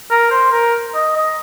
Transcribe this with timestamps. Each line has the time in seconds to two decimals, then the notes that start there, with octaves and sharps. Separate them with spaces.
0.11 A#4
0.31 C5
0.52 A#4
0.95 D#5
1.16 D#5